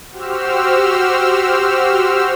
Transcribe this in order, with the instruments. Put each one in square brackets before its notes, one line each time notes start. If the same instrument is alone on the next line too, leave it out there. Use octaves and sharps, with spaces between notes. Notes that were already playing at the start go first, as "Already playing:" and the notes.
[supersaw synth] F#4 G4 C5 E6 F6